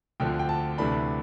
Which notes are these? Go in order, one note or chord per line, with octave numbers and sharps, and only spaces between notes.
D2 D3 F3 C4 G5
G5
A5
D2 C3 E3 A3 D4 B5